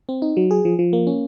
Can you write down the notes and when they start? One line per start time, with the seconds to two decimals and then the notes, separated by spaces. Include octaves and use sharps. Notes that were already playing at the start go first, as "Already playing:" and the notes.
0.09 C4
0.22 D#4
0.37 F#3
0.51 G#4
0.65 F3
0.79 F3
0.93 A#3
1.07 C#4